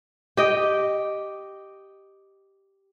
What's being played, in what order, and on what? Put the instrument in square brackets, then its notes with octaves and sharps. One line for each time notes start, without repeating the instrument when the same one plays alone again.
[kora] G4 D#5 G5